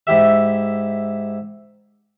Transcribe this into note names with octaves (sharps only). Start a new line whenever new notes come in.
G#2 E4 G4 E5